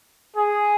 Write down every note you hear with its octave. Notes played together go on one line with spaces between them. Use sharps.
G#4